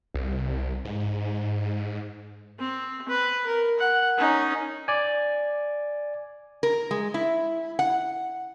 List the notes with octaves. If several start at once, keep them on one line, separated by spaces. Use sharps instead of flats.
C2
G#2
C4
B4
A#4
F#5
C#4 D#4
D5 G#5
A#4
G#3
E4
F#5